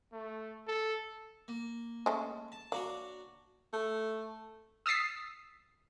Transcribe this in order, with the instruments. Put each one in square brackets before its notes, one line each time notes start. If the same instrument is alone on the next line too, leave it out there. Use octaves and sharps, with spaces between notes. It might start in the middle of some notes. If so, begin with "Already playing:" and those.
[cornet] A3
A4
[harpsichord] A#3
[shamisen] G#3 A3 C#4
[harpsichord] A5
[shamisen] A#3 [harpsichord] D4 F#4 C#5
[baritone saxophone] A3
[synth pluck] D#6 E6 A6 B6 C7